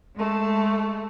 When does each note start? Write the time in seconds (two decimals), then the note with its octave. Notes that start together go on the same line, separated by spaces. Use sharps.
0.16 G#3 A3